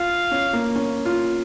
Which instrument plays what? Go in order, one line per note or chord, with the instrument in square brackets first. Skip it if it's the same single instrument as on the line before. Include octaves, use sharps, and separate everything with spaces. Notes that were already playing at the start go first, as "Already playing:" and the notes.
Already playing: [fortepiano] F4 [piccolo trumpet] F5
[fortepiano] C#4
A#3
C#4
F4